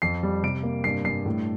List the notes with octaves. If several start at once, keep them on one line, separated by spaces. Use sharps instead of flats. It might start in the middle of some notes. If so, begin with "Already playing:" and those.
F2 C7
G3
C3 D7
A#3
G2 C7
G2 C7
A2